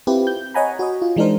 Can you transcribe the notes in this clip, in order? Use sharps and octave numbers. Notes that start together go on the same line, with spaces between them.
C4 E4 F4 G4 B4
G6
C#5 D#5 F#5 G#5 A#5 B5
F#4 C#5 D#5
F4
E3 G#3 D4 D#4 A#4 C5